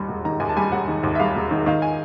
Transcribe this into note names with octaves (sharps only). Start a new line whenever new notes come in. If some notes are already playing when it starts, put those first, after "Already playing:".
Already playing: D#2 G3
E1
D#3 A#5
D#2 G#5
A5
G3 G#5
E1 F#5
D#3
D#2
E5
G3 F5
E1
D#3
D#3 F5
G#5